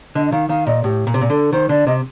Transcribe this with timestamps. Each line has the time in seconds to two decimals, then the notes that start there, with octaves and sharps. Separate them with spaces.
0.15 D3 D#5
0.26 D#5
0.32 D#3 F5
0.49 D#3 F5
0.67 A#2 D#5
0.84 A2 G4
1.07 A#2
1.14 C3
1.21 A#2
1.30 D3 A4
1.53 D#3 C5
1.69 D3 D5
1.87 C3 D#5